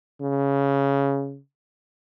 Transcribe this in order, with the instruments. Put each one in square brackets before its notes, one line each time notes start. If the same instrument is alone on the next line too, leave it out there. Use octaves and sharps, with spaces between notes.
[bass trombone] C#3